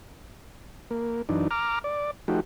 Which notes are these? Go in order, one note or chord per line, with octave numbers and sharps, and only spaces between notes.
A#3
F#2 E3 D4 D#4
A#5 D6 F6
D5
F3 A3 D#4 F#4 G4